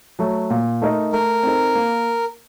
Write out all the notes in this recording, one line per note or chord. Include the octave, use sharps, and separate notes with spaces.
F#3 A3
A#2
A3 D#4 A#4 D#5
A3 A#4
C4 D#4 A4
A#3